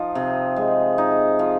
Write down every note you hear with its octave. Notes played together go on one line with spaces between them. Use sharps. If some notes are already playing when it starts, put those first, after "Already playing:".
Already playing: F3 D#4
C3
G#3
D#4
F3